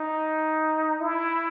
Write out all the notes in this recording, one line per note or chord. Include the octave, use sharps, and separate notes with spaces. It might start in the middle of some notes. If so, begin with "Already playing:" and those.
Already playing: D#4
E4